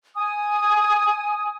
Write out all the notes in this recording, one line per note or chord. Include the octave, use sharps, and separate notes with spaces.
G#5 D#6